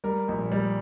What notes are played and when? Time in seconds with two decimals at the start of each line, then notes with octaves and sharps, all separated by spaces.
0.04 G3 A#4
0.28 A#1
0.52 G3